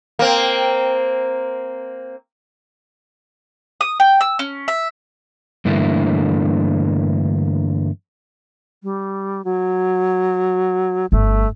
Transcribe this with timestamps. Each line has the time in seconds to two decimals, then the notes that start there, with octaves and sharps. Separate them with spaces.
0.19 A#3 C4
3.81 D#6
4.00 G5
4.21 E6
4.39 C#4
4.68 E5
5.65 G2 D3 E3 A3 A#3 E4
8.83 G3
9.45 F#3
11.12 G1 A3